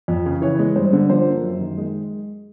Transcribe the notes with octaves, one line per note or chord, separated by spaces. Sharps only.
F2
C#3
E3 C#5
G#3
G2 C5
D3
F3 C5
A#3
F#2
D#3
G#3